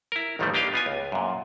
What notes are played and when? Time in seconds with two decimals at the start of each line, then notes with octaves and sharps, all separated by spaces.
0.12 E4 A#4
0.39 A1 D#2 D#3 F3 G3 A3
0.54 A#3 D4 G4 D#5 F5
0.73 B3 F4 G#5
0.86 C#2
1.12 F#2 A#2